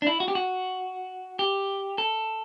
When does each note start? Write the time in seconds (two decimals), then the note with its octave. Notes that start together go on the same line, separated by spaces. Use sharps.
0.02 D4
0.07 E4
0.20 F#4
0.28 G4
0.35 F#4
1.39 G4
1.98 A4